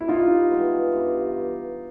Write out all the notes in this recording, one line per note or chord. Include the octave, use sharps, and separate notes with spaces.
E4
G2 D#4 F4
E3 G#3 B3
G2